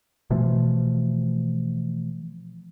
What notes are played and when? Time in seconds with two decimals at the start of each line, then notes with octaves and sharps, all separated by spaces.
0.30 B2 E3 F3 A3